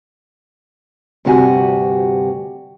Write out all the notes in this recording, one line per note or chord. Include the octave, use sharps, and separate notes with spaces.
D2 G2 C3 F#4 G4 G#5